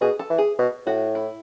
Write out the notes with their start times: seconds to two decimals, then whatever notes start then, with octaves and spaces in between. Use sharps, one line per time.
0.01 B2 G#4
0.19 A4
0.30 E3
0.38 G#4
0.59 B2
0.86 A2 F#4
1.15 E4